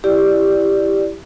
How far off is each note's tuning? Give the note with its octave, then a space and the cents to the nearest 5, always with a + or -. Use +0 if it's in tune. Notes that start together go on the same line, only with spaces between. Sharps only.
E4 +5 G4 +0 D5 +0